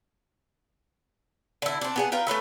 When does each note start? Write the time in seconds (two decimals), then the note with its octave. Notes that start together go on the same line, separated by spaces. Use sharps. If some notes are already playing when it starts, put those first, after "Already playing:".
1.62 D3 E4
1.81 C4 D4
1.96 B3 G#4 F#5
2.12 F4 A#4 B4 G5
2.27 A3 C#4 B4 E5